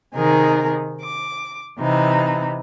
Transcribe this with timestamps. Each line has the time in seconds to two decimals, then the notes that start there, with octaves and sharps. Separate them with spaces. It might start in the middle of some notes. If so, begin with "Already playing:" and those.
0.14 C3 D#3 D#4 G#4 A#4
1.02 D6
1.78 C3 E3 D#4